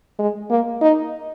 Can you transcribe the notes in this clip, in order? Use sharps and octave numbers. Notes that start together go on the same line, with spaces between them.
G#3
A#3
D#4